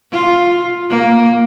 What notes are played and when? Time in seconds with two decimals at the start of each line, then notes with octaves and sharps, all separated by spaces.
0.12 F4
0.90 A#3